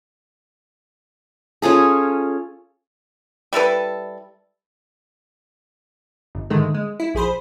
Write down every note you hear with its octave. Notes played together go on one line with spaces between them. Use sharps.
C#4 F4 G#4 A4
G3 E4 A4 B4
G1
G#2 D3 D#3 G#3 A3
G#3
E4
A#1 G#4 C5 B5